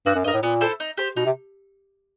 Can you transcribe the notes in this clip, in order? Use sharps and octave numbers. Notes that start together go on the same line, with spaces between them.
G2 F#4
F#2
G2 A#4 D#5
A2
A#2 B3
E4 A4 C5
D#4
G4 C5
B2 D#4
C3